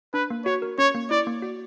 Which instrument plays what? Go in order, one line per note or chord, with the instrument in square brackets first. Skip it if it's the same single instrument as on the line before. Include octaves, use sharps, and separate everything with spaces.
[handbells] D4 [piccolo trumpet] B4
[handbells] A#3
[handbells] F#4 [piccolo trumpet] C#5
[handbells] A#4
[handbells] C#4 [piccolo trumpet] C#5
[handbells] A#3
[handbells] E4 [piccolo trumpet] D5
[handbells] A#3
F#4